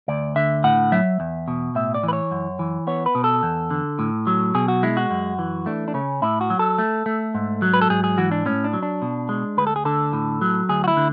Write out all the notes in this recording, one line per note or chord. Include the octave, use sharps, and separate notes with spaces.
D2 D5
D3 E5
A2 F#5
F#3 E5
E2
B2
A2 E5
D5
E3
B4
C#5
F#2
E3
B3 C#5
B4
B2
A4
E2
D3
A2
F#3
B2 G#4
F#4
G#3 E4
F#4
F#2
E3
A3 D4
D4
C#3 C#4
A2 E4
F#4
F#3
A4
A3
A3
G#2
F#3
B4
A4
G#2 G#4
G#4
E3 F#4
D4
A2 C#4
D4
F#3
D4
B2
G#3
D2 B4
A4
G#4
D3 A4
A2
F#3
D2 G#4
F#4
E4
D3